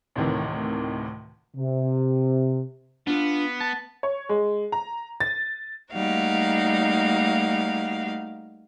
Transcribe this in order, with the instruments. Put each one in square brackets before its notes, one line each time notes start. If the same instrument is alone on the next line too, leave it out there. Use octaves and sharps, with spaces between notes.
[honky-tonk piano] D2 A2 C3 D#3 E3
[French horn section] C3
[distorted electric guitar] B3 [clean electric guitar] D4 F4
[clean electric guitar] A5
[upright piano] C#5
G#3
A#5
A6
[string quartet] G3 A3 A#3 D#4 F#4 F5